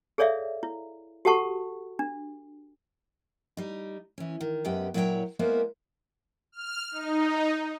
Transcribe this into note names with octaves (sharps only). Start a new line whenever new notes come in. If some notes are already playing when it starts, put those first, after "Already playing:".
G#4 A4 C#5 D5 E5 F5
E4
F#4 G4 A4 F#5 A5 C#6
D4
G3 D#4
E3 C#4
D#3
F#2 G#3 B3 G4 G5
A#2 F#3 E4 A#4 C#5 G5
G#3 A#3 B3 E4 A#4 C5
F6
D#4